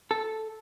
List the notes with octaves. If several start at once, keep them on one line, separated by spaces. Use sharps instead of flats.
A4